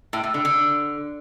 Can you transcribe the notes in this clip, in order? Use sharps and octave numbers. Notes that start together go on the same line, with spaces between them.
A2
A2
D3
D3